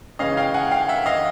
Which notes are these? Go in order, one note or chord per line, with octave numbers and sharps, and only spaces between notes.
C#3 E3 G#3 C#4 D#5 F5
F5 G5
F#5 G#5
F5 G5
E5 F#5
D#5 F5